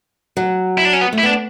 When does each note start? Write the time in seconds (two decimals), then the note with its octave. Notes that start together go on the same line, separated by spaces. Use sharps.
0.37 F#3
0.78 E4
0.85 D4
0.93 C#4
1.01 B3
1.13 A3
1.18 E4
1.23 B3 D4